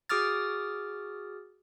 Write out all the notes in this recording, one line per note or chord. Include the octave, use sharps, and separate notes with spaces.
F#4 G#4 D6 D#6 F6 A6